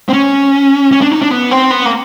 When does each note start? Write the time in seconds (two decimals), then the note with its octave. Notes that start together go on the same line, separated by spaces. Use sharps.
0.09 C4
0.13 C#4
0.91 C#4
1.01 D4
1.12 D#4
1.22 D4
1.31 B3
1.51 C4
1.71 B3
1.85 A#3